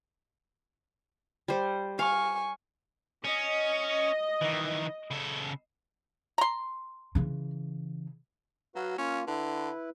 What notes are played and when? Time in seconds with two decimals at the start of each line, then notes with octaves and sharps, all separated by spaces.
1.48 G3 C5
1.99 F5 G#5 C#6
3.25 C#4 D#5
4.42 D#3 E3
5.11 C#3 A4
6.38 A#5 C6
7.15 C#3 E3
8.76 F#3 F#4 B4 F5
8.98 A#3 C#4 F4
9.27 D3 E4 B4